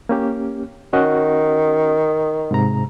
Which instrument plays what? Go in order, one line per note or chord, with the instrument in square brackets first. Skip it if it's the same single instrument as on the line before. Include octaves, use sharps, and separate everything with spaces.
[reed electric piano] A#3 C#4 G4
[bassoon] D#3 [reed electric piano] C#4 F#4 D#5
[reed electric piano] G#2 C3 A#5